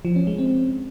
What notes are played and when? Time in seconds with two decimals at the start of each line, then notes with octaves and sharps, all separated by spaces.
0.05 F3
0.16 C#4
0.27 G#3
0.38 C4